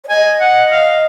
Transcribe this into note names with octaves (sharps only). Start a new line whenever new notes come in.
C#5
D#5 G#5
F#5
F5